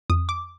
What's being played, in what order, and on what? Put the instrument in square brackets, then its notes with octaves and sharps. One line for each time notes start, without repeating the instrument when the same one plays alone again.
[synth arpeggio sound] F2 D#6
D6